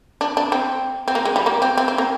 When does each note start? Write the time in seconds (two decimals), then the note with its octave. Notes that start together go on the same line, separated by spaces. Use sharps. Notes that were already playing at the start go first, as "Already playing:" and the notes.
0.21 D4
0.37 D4
0.52 C4
1.08 C4
1.15 A#3
1.25 G#3
1.36 G3
1.46 A#3
1.62 C4
1.78 C4
1.88 C4
1.98 A#3